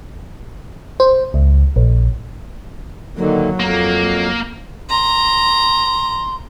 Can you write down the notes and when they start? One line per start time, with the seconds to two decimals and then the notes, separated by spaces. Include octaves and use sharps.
1.00 C5
1.34 C#2
1.76 A#1
3.17 D3 D#3 F#3 A#3
3.60 F2 A#3
4.90 A#5 C6